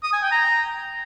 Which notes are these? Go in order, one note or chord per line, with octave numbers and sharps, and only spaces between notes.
D#6
G#5
G5
A#5